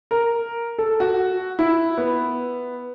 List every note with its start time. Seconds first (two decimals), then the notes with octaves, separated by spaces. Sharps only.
0.11 A#4
0.78 A4
1.00 F#4
1.59 E4
1.98 B3